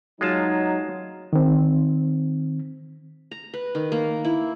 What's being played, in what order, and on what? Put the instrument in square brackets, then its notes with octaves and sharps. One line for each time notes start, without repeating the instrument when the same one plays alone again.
[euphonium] F#3 [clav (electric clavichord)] G#3 F4 A5 [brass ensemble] D#4
[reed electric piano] D#3 C4
[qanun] A#5
B4
D#3
A#3
E4